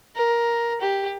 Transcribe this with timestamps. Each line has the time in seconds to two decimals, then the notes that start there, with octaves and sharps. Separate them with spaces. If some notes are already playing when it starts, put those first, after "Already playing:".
0.16 A#4
0.81 G4